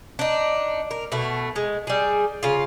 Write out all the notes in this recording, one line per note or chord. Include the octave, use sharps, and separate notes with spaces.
D4 D#4
A#4
B2 A3
G#3
G3 G#4
C#3 F4